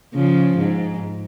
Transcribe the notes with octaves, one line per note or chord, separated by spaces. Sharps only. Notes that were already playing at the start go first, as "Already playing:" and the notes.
C#3 F3
G#2